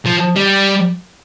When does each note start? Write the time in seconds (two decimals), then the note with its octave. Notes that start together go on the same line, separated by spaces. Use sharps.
0.06 F3
0.36 G3